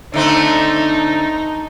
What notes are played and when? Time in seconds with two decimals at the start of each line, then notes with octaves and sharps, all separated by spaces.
0.14 D3 A3 C4 D#4